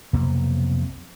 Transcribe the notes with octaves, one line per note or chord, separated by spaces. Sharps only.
B1 F2 C3 A#3